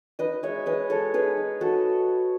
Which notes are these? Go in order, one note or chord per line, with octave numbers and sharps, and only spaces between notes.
D#4 B4 D#5
G#3 C#5 E5
G#3 B4 D#5
G#3 A4 C#5
D#4 G#4 B4
D#4
D#4 F#4 A4